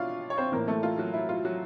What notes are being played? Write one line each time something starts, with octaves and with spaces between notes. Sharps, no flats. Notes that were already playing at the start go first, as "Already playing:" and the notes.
Already playing: B2 D4 E4 F4 C#5 F5
C#5
C4 C5
A2 E3 A#3 A#4
A3 A4
F4
F#3 F#4
E4
F4
F#3 F#4